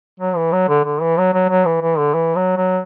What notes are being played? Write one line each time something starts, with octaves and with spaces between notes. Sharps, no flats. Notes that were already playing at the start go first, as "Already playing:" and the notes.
F#3
E3
F#3
D3
D3
E3
F#3
F#3
F#3
E3
E3
D3
E3
F#3
F#3